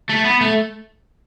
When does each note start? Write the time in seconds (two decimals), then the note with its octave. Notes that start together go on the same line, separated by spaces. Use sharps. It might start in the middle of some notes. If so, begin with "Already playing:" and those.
0.09 A3
0.25 B3
0.41 A3